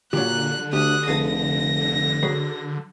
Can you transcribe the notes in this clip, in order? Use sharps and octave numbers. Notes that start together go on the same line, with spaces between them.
A#2 D3 F#3 G4 F#6
D2 G4 D#6 F#6
F1 G#4 A4 B4 A#6
F#3 G#4 B4